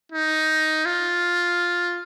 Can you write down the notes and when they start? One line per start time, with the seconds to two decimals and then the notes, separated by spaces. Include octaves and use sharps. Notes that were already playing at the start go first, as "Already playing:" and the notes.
0.12 D#4
0.86 F4